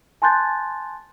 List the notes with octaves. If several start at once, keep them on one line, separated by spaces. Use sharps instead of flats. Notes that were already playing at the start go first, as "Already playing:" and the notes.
G#5 A5 C6 F#6 G6 A6